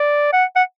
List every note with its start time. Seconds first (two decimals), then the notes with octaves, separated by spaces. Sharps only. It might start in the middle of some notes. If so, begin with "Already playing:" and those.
Already playing: D5
0.33 F#5
0.56 F#5